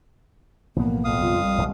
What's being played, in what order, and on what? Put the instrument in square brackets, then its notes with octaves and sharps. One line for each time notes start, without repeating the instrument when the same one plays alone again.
[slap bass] B1 B3 [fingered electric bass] A2 E3 F3 [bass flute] A#3
[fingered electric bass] E1 A1 A2 [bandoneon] F2 F5 D#6
[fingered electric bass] F#2 C#3 G3 [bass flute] F4
[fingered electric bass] A#1 [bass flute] G3
[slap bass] D#1 C2 G#3